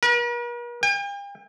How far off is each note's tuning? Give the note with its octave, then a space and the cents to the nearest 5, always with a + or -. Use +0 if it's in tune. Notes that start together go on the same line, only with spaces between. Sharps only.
A#4 +45
G5 +45